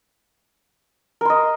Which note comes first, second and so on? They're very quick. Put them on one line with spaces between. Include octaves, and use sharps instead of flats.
A#4 C6 D#5